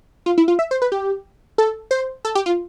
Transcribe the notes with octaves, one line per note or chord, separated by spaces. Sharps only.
F4
E4
F4
E5
C5
B4
G4
A4
C5
A4
G4
F4